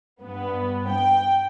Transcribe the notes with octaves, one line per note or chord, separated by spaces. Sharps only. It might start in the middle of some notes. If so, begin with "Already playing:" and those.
G2 B3
G5